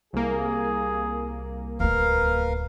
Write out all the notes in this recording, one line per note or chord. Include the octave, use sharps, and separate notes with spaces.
C2 A#3 G#4
D1 A3 A#4 B4 F5